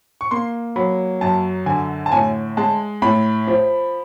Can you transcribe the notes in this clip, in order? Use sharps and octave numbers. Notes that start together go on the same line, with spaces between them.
C#6
A#3 C6
F#3 B5
F#2 A5
D3 G#5
A5
A2 G#5
G#3 A5
A2 B5
F3